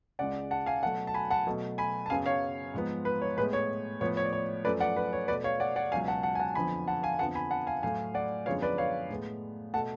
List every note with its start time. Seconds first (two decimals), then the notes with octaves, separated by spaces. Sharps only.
0.19 C#2 C#3 G#3 D5 F#5
0.51 F#5 A5
0.66 F5 G#5
0.83 B2 F#3 A3 F#5 A5
1.07 A5
1.14 G#5 B5
1.31 F#5 A5
1.46 B2 F#3 A3
1.78 G#5 B5
2.06 A5
2.10 F#2 C#3 F#3 B3 F5 G#5
2.26 C#5 F5
2.74 G#2 F3 B3
3.05 B4
3.22 C#5
3.37 A2 G#3 B3 B4
3.53 C#5
4.01 A2 F3 B3 C#5
4.17 C#5
4.25 D5
4.33 C#5
4.65 F#2 F3 A3 B4 D5
4.80 D5 F#5
4.96 B4
5.13 C#5
5.28 B2 A3 B4 D5
5.44 C#5 F5
5.60 D5 F#5
5.76 D5 F#5
5.92 C#2 B2 F#3 F5 G#5
6.08 F#5 A5
6.23 F#5 A5
6.35 G#5
6.40 F#5 A5
6.55 F2 D3 F3 B3 G#5 B5
6.88 F#5 A5
7.03 F5 G#5
7.19 F2 D3 F3 B3 F#5 A5
7.35 G#5 B5
7.51 F#5 A5
7.67 F5 G#5
7.83 A2 F#3 A3 F5 G#5
8.14 D5 F#5
8.46 F#2 D3 F3 G#3 B3 C#5 F5
8.62 B4 D5
8.78 C#5 F5
9.10 A2 G#3 B3
9.74 B2 A3 F#5 A5